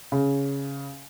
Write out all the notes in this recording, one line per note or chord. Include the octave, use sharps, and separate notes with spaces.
C#3